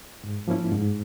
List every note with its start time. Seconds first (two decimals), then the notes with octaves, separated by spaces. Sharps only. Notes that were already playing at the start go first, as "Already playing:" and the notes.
0.24 G#2
0.48 F3 A#3 C#4 E4
0.72 G#2